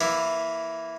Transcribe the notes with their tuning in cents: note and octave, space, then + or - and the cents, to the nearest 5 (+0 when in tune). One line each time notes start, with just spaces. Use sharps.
E3 +0 A#3 +15 E4 +0